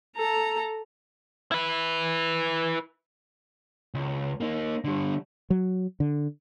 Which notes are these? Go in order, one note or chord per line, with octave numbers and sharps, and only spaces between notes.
A4 A#5
E4 B4
C#2
A#3 D#4
D3 G3
F#3
D3